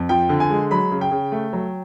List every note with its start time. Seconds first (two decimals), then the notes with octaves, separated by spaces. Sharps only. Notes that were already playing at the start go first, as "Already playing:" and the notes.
Already playing: F2
0.09 F3 G5
0.29 D3
0.40 G#5
0.50 G#3
0.71 F#3 B5
0.91 C#3
1.01 G5
1.11 C#3
1.32 A3
1.53 F#3